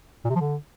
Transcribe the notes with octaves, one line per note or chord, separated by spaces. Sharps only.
A#2
C3
F3
D3